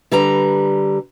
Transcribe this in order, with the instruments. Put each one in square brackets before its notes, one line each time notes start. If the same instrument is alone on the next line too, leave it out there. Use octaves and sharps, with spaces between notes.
[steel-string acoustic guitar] D3 G3 B4 A#5